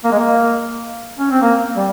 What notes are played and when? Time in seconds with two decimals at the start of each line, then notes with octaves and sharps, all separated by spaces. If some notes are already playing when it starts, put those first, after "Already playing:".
0.04 A#3
0.12 G#3
0.19 A#3
1.19 C#4
1.30 C4
1.42 A#3
1.77 G3